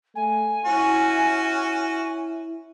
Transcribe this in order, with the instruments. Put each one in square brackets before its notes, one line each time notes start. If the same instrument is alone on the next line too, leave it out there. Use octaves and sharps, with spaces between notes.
[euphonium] A3 [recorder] G#5
[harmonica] C#4 F#4 [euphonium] E4